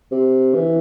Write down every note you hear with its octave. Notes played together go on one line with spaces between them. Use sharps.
C3
E3